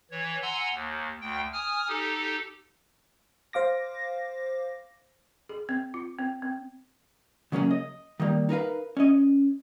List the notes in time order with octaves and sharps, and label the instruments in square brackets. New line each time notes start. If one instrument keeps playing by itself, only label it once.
[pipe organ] E3 C#5
F#5 G#5 A#5 C6 E6
D#2
D2 G5
G#5 D#6 F6
D#4 G4 A4
[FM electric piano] C5 F5 D6 A#6
[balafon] G#4
C4
F4
C4
C4
[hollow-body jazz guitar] C#3 F#3 A#3 C4 C#4 G#4
D#5
D#3 G3 A#3
D#4 A#4 B4 F5
C#4 D#5